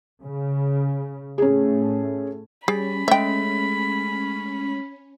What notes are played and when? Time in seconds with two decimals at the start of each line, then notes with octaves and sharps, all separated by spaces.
0.23 C#3
1.38 A2 A3 C#4 G#4
2.68 G3 C#4 G#4 B5
3.08 G#3 A3 E5 G5